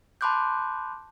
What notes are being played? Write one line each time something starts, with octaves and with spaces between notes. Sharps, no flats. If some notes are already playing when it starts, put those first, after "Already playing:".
A5 B5 C6 D6 F#6 G6